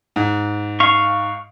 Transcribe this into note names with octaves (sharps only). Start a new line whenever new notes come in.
G#2
F5 C#6